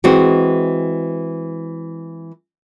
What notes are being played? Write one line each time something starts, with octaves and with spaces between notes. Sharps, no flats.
E3 G#3 C4 F#4